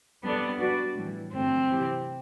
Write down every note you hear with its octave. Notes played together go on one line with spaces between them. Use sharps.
G3 B3 D4 A4 D5
G3 D4 F#4 B4 D5
A2 E3 G3
G2 D3 F#3 A3 C4
C3 E3 A3 E4 G4